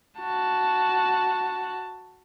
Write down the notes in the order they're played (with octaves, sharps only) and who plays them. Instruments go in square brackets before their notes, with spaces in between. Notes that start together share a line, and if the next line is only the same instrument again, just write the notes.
[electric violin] F#4 A5